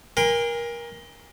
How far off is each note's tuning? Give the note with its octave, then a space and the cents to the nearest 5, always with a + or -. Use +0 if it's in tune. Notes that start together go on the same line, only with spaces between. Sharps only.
A#4 +20 G#5 -35 C6 -25